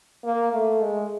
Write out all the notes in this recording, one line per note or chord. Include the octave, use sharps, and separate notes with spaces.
A#3
A3
G#3